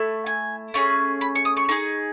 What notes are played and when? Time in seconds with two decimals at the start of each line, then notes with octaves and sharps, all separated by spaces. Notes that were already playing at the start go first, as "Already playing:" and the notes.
Already playing: A3 E4
0.26 G#5
0.74 A3 C#4 G#4
1.21 B5
1.35 C#6
1.45 D#6
1.57 C#6
1.69 D#4 G#4 C#6